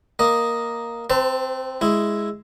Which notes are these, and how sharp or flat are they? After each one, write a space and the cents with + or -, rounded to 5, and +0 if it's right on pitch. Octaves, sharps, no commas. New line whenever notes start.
A#3 +0 D#5 +0
C4 +0 C5 -40 A5 +30
G#3 +0 E4 +0